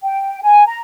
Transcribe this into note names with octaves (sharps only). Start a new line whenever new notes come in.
G5
G#5
A#5